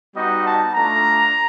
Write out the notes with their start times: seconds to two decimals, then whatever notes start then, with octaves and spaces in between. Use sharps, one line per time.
0.16 G3 B3 D#4 F#4 D#5
0.45 A5
0.74 A3 D4 F4 A#5